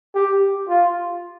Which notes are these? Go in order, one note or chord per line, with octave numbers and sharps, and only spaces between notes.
G4
F4